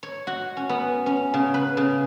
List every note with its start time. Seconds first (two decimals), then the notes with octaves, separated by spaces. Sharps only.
0.03 C#5
0.27 F#4
0.57 C#4
0.69 B3
1.06 C#4
1.34 C#3
1.54 B4
1.77 C#3